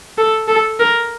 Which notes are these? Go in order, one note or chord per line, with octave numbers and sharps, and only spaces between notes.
A4
A4
A#4